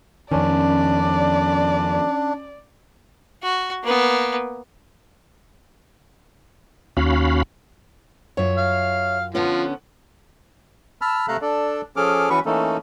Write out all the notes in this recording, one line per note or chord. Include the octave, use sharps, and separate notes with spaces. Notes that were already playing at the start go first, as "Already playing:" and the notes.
F2 D#3 C#4 D4 D5
F#4
A#3 B3
D#2 C#4 F#4 F5 B5
F#2 F4 C#5 E5
F5
D3 F3 B3 C#4
A5 B5 E6 F6
C3 A3 A4 F5 A#5 F#6
D4 A4 D5
F3 C#4 G#4 A4 D6 F6
E3 C#4 F#4 B4 B5 C#6
E3 A3 A#3 C#4 D#4 A4